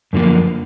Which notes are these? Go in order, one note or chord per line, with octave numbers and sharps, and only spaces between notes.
F#2 D3 F3 A#3